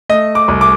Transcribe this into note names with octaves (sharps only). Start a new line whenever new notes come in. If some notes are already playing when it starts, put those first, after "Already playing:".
A3 D#5
D6
C2
D6